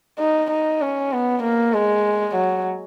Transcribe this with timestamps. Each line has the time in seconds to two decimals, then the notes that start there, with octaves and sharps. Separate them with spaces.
0.19 D#4
0.51 D#4
0.82 C#4
1.13 B3
1.43 A#3
1.74 G#3
2.35 F#3